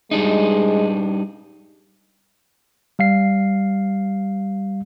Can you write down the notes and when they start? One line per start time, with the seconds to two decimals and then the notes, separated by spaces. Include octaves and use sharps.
0.11 G3 G#3 D4 D#4
2.99 G3 F5 C7